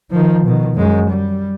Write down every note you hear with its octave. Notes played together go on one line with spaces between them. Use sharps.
D#3 F3
B2 D#3
F#2 G#3
G3